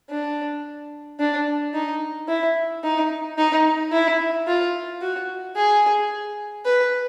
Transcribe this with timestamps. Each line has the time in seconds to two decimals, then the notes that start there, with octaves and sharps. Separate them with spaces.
0.10 D4
1.19 D4
1.74 D#4
2.28 E4
2.83 D#4
3.38 D#4
3.92 E4
4.47 F4
5.02 F#4
5.56 G#4
6.66 B4